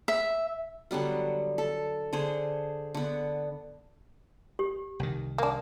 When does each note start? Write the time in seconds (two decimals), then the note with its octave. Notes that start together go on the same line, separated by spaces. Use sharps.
0.08 E5
0.91 D3 F#3 G3 B3
1.58 A4
2.13 D3 G#4 C5
2.95 D3 B3
4.59 G4
4.99 C2 D#3
5.38 A#3 D4